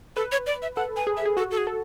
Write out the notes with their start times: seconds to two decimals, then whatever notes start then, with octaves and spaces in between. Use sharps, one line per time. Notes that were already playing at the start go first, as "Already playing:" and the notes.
0.16 A4 B4
0.32 C#5
0.47 D5
0.62 E5
0.76 A4 F#5
0.96 G#5
1.07 G#4
1.17 E5
1.25 G#4
1.37 F#4 A4
1.51 A4
1.58 G#4
1.67 A4